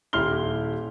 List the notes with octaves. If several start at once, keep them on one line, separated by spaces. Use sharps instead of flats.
D#1 E4 G4 C6 F6 G7